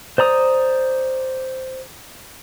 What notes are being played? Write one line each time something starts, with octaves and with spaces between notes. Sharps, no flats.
C5 D5 A#5 D#6